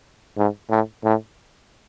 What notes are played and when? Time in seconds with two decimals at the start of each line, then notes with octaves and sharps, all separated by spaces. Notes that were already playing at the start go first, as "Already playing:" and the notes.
0.37 G#2
0.70 A2
1.04 A2